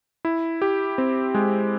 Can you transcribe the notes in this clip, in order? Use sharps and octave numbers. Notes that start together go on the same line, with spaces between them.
E4
G4
C4
G#3